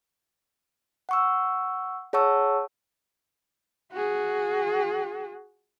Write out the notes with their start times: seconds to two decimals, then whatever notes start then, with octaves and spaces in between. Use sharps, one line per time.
1.09 F#5 C#6 E6
2.13 G#4 C#5 F#5 A5 C#6 E6
3.93 F#4 G#4